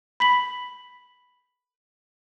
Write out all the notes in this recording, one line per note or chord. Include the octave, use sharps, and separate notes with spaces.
B5 B6 F#7